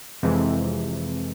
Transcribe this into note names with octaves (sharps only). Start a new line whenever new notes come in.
F2 C3 E3 G#3